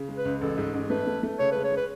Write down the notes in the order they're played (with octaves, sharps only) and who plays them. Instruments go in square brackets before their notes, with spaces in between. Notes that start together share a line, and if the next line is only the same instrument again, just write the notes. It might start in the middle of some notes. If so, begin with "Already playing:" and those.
Already playing: [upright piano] C#3
G#3
[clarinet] B4
[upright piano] C#2
[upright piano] A1 [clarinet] A4
[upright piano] G#2
A1
[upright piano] A3 [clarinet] B4
[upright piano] A3
A3
[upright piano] C#3 [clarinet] C#5
[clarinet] B4
[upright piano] G#3
[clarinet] C#5
[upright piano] G#3 [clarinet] B4